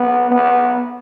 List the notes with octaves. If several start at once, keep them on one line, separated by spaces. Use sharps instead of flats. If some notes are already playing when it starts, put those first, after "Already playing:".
Already playing: B3
B3